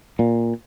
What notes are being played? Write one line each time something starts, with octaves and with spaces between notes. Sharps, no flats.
A#2